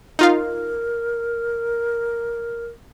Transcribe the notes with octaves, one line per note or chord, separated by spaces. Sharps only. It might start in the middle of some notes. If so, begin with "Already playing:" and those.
D#4 F4 A#4 F5